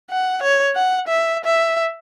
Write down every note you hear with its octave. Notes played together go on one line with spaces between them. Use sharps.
F#5
C#5
F#5
E5
E5